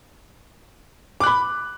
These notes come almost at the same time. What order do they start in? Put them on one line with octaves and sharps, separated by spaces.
D6 F#6 B5